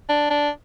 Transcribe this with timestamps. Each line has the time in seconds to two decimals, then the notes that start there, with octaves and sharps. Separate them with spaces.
0.09 D4
0.30 D4